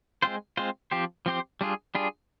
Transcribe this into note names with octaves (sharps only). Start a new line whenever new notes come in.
G#3 C4 F4 C5
G#3 C4 F4 C5
F3 C4 G4 C5
F3 C4 G4 C5
G3 D4 F4 G#4
G3 D4 F4 G#4